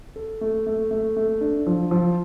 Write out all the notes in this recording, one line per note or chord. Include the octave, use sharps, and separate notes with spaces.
A4
A3
A3
A3
A3
D4
F3
F3